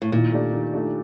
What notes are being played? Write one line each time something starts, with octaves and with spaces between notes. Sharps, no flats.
A2
A#2 D#3
A3 D4 G4 D5
D#3
A3 D4 G4 D5